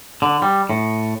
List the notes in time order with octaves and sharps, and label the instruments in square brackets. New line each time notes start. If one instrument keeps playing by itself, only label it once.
[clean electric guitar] D3
G3
A2